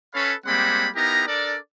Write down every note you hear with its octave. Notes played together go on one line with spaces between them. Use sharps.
C#4 A4 B4 C#5 F5 B5
G3 G#3 A#3 C4 F#5 B5
B3 D#4 E4 G4 A#4 A#5
D4 A4 A#4 D5